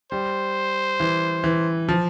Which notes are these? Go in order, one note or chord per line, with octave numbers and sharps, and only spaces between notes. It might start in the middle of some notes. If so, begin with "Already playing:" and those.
G3 C5
E3
E3
F3